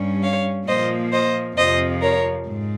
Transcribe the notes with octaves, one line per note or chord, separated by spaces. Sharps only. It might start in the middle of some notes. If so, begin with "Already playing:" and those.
Already playing: G2 G3 C#4
C#5 F5
A#2 F3 A#3 C5 D#5
C5 D#5
F2 C3 F3 C5 D#5
A#4 C#5
G#2